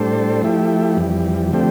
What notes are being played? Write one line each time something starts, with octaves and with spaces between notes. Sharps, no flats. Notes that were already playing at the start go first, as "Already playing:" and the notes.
Already playing: A2 G3 D4 A4 C5
F3 A3 E4 G4
F2 E3 G3
D3 F3 A3 C4 G4